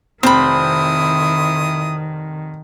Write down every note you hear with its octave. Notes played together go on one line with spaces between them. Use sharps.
F1 D#3 C4 E4 C5 B5 D#6